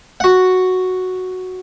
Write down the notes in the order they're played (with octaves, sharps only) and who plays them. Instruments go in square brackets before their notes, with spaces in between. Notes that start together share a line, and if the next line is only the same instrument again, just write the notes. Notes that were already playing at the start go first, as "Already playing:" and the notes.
[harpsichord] F#4 F#5